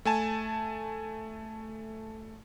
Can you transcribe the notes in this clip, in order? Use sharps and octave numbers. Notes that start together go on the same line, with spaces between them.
A3 G#5 A5